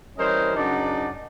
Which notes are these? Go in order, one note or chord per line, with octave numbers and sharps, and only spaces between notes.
E3 G3 C#4 A#4 C5 D#5
F#2 C#3 D4 D#4 D5 F#5